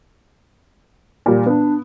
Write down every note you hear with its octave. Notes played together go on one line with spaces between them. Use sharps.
A#2 G3
B3 D4